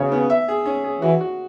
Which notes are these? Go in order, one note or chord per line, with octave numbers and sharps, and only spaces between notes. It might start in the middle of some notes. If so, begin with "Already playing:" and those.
Already playing: C#3 B3 F#4 C#5
B3
E5
G#4
C#4
G#4
E3 F#4
F#4